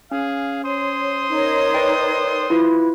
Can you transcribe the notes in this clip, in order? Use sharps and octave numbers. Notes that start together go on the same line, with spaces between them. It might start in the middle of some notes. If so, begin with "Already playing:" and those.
C#4 G#4 F5
C5 C#5 C6 D#6
D#4 A#4 C#5
B4 D5 G5
E4 F4 B4